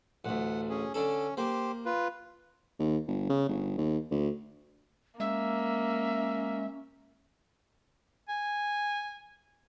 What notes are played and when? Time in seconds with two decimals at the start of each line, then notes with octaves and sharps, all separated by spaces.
0.25 A1 D2 F#5
0.70 C#4 G#4
0.94 D3 C#4 A4
1.37 A#3 G4 C5
1.85 F4 B4
2.79 D#2
3.07 G1
3.29 C#3
3.49 G1
3.78 D#2
4.11 D2
5.20 G#3 A#3 C#4 E5
8.29 G#5